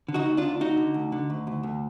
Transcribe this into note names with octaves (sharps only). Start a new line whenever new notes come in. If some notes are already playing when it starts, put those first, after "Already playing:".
D3
D#4 F#4
D2
D4 F4
D2
D2 D#4 F#4
D3
D2
D3
D2
D2
D2